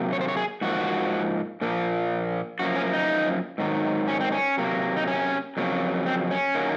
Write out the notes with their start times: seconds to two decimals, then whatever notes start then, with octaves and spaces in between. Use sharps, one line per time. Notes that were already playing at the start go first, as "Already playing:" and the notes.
Already playing: C3 F#3 A#3
0.13 C#5
0.21 C5
0.28 C#5
0.37 G#4
0.61 G#2 F3 A#3 F#4
1.61 A#2 F3 A#3
2.59 F#2 F3 A#3 F#4
2.76 C#4
2.93 D#4
3.58 G#2 D#3 F#3
4.08 C#4
4.21 C4
4.32 C#4
4.57 C3 F#3 A#3
4.97 D#4
5.07 C#4
5.57 F2 C#3 F#3 A#3
6.06 C4
6.31 C#4
6.55 D#3 F#3 A#3